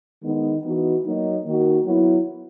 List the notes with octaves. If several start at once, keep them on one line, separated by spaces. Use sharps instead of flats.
D#3 G#3 B3 D#4
E3 B3 D#4 F#4
F#3 A#3 D#4
D#3 A#3 D#4 F#4
F#3 B3 E4